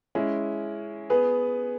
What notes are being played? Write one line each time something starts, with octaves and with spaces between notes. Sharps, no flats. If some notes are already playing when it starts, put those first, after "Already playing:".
G#3 C#4 E4
B3 G#4 B4